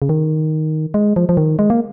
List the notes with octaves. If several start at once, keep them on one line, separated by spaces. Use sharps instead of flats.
C#3
D#3
G#3
F3
F3
D#3
G#3
A#3